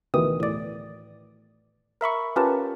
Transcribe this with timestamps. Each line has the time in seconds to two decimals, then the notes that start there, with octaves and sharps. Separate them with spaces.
0.14 D2 B2 D#3 E3 G4 D#6
0.40 A2 D5
2.01 A#4 E5 B5 C#6
2.36 C#4 F4 G4 A#4 B4 A5